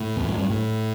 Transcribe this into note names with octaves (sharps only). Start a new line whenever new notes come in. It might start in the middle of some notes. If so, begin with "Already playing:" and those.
Already playing: A2
E2
F#2
G2
A2